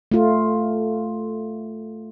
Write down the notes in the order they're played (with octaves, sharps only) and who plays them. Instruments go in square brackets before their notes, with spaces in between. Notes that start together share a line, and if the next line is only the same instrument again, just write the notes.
[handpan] A3 F4